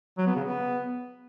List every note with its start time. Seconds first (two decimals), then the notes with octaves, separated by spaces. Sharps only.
0.18 F#3
0.27 B3
0.35 C#3
0.44 B3